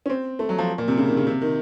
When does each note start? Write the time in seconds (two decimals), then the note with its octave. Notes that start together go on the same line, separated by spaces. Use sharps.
0.06 C#4
0.10 C4
0.39 A3
0.49 F#3
0.58 F3
0.78 A#2
0.88 C3
0.98 C#3
1.07 D#3
1.17 C#3
1.27 C3
1.42 D#3